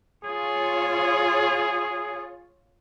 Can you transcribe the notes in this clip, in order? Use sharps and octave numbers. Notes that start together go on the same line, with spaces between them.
F4 G#4 C#5